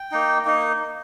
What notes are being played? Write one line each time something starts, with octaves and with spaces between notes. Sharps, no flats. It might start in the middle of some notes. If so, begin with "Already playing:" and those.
Already playing: G5
A#3 D#4
A#3 D#4